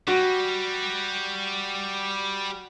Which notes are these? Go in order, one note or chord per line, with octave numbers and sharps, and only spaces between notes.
G3 F#4